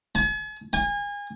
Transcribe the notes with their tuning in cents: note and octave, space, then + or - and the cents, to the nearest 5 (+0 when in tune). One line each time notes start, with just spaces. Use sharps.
G#5 +45
G#5 -30